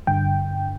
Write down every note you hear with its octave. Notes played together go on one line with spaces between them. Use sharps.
G2 D3 G5